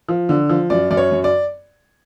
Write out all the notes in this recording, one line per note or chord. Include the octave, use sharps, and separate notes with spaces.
F3
D3
F3
F#2 D5
F#2 D5
C#5
F#2
D5